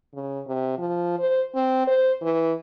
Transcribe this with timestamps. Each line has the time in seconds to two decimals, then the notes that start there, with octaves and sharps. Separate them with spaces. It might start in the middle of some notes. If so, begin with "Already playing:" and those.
0.14 C#3
0.47 C3
0.78 F3
1.19 C5
1.55 C4
1.87 C5
2.22 E3